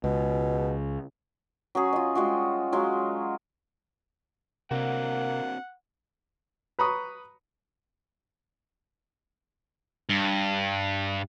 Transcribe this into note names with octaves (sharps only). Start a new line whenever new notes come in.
C#2 B2
F#3 C#4 G#4
F4 D#5
G3 G#3 F4 F#4
F#3 G#3 F4
C3 A#3 C4 D4 F#4 F#5
B4 A#5 B5 C#6 D#6
G2